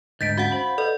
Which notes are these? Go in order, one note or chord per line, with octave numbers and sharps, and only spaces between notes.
D2 G#2 D#5 G6 A6 B6 D7
C#4 F#4 F5 F#5
C5 B5
A4 B4 D5 D#5